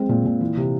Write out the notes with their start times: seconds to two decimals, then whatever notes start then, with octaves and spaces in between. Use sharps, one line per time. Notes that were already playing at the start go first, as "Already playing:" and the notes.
Already playing: G#3 C4
0.09 A#2
0.25 A#2
0.41 E3
0.57 C3